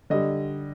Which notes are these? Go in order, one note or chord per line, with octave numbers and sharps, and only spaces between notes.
D3 G3 D#5